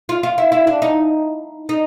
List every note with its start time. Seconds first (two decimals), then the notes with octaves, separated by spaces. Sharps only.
0.09 F4
0.23 F4
0.38 E4
0.52 E4
0.67 D4
0.82 D#4
1.69 D#4